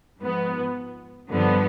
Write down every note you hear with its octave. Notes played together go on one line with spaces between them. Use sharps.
G#2 F3 B3
G2 D3 F3 B3